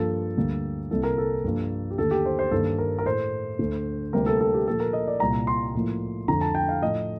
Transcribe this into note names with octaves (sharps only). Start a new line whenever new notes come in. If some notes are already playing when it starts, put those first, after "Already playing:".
Already playing: G2 F3 A#3 A4
D2 D3 G3 A#3
C2 C3 G3 A#3 A4
A#4
A4
G2 F3 A#3
G4
D#2 D3 A3 A4
G4
C5
C5
G2 D#3 A#3 A4
A#4
A#4
A2 A3 C5
D2 D3 A3
D2 C3 G3 A#3 A#4
A4
A4
G4
A#2 F3 A3 A4
A#4
D#5
D5
C2 A#2 G3 A#5
C6
A2 F3 A#3
F2 D3 A3 A#5
A5
G5
F5
A2 F3 A3 D#5